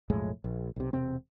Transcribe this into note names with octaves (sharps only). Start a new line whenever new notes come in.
B1 F2 A2 G#3
A#1
B1 C3
E1 C3 C4